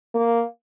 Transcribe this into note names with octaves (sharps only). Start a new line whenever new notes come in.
A#3